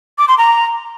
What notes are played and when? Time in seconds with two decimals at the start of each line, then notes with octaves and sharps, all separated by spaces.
0.18 D6
0.28 C6
0.38 A#5